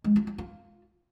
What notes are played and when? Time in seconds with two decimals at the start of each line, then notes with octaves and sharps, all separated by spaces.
0.04 G#3
0.16 F4
0.27 F4
0.38 F4